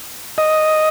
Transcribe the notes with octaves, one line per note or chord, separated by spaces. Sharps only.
D#5